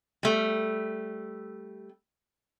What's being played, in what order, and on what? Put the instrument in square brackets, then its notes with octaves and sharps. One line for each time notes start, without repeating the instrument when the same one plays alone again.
[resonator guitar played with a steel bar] G3 A3